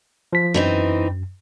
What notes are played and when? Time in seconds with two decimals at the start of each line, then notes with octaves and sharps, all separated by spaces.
0.33 F3 B6
0.54 F#2 E3 C4 D#4